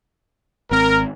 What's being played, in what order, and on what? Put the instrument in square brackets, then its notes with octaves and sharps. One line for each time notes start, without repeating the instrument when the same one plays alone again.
[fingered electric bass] G#1 C4 [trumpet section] A#4